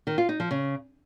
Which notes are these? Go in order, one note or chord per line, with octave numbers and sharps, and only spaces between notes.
D#3
F4
D#4
F3
C#3